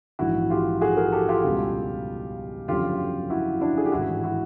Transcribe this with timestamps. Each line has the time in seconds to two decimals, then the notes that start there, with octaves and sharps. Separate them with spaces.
0.19 A#1 G#2 E3 E4 F#4
0.50 F4 G4
0.81 F#4 G#4
0.97 G#4 A#4
1.12 G4 A4
1.28 F4 G4
1.44 C#2 B2 G3
2.68 G1 F2 C#3 F#3 F4 G4
3.30 E4 F#4
3.61 D4 E4
3.77 G#4
3.86 G4
3.92 A1 G#2 D#3 E4 F#4
4.23 E4 F#4